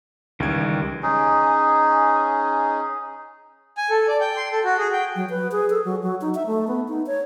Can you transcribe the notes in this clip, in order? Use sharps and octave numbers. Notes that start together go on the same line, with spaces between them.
C#2 D#3 E3 G3 G#6
C#4 D#4 G#4
G#5
A4
D5
G5
C6
A4
F#4
G#4
G5
F#3
B4
G#4
A4
F#3
F#3
D#4
E5
A3
B3
D#4
C#5